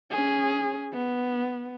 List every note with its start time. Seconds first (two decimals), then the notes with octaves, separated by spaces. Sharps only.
0.11 C#4 G#4
0.93 B3